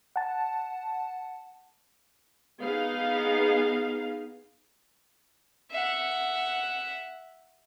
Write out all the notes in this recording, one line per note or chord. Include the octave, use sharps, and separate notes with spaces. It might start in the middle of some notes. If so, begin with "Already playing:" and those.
F#5 A5
B3 D#4 G#4 F5
E5 F#5